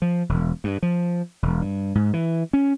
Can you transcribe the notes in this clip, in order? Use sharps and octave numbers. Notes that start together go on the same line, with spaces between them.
F3
E1
G2
F3
E1
G2
G#2
E3
C#4